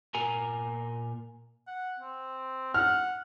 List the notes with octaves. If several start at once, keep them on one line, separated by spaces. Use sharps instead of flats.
A#2 A#4 G#5 A#5
F#5
C4
F#5 F6